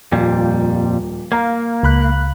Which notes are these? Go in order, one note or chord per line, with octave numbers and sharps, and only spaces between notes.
D#1 F2 A#2 G3
A#3 F5 A#5
C#2 B5 F#6